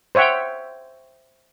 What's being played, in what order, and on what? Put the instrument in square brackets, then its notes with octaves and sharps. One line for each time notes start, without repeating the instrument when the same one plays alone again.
[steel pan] C5 C#5 E5 F#5 G5